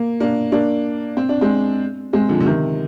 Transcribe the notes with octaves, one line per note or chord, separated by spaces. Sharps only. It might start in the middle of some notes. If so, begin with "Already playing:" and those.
Already playing: A#3
A#3 D4
A#3 D4
C4
D4
G#3 C4
G#3 C4
D3 F3
D3
C3 D#3